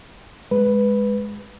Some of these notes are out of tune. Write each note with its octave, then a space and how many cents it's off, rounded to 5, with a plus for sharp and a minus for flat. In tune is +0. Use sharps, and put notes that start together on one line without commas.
G#3 +0 B4 +0